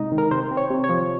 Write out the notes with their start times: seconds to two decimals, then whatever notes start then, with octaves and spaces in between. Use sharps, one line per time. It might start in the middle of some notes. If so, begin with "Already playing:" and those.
Already playing: C3 G#3 D#4
0.12 D#3
0.18 A#4
0.31 C3 C5
0.51 C4
0.57 C#5
0.70 C3
0.84 C#5
0.89 F3